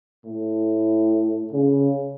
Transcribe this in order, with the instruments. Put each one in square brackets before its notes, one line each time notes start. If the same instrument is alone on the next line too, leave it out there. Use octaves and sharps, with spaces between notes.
[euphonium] A2
C#3